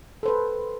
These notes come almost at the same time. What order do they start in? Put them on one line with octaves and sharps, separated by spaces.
A4 C5 B4